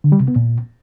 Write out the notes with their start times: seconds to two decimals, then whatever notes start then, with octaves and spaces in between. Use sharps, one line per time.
0.04 D3
0.12 G3
0.20 C3
0.28 B3
0.36 A#2